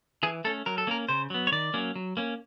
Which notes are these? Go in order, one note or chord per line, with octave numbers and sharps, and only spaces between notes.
E3 G#4
A3 C#4 A4
F#3 A#4
A4
A#3 C#4 A#4
C#3 C5
F#3 B3
C#5
D#3 D5
F#3 A#3 C#4
F#3
A#3 C#4